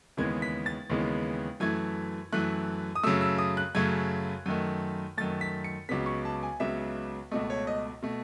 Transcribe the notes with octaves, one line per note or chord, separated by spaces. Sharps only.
D#2 C#3 E3 G#3 B3 G#6
B6
A6
D#2 C#3 E3 G#3 B3
F#2 E3 A3 G#6
F#2 E3 A3 F#6
D#6
F#2 C#3 F#3 A3 E6
E6
D#6
F#6
F#2 C#3 F#3 A3 G#6
F#2 D#3 A3
F#2 D#3 A3 A6
B6
C#7
C#2 C#3 F#3 B3 B6
C#6
A5
G#5
C#2 C#3 F#3 B3 E5
C#2 B2 A3 D#5
C#5
D#5
B2 A3